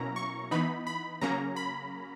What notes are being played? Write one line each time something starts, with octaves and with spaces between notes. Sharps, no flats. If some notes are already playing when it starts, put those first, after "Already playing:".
Already playing: B2 F#3 A#3 C#4 E4 A#5
C#6
E3 B3 D#4 B5
B5
C#3 F#3 A#3 C#4 A#5
B5